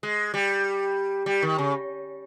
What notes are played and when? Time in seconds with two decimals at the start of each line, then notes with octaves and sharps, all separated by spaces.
0.03 G#3
0.34 G3
1.26 G3
1.42 D#3
1.58 C#3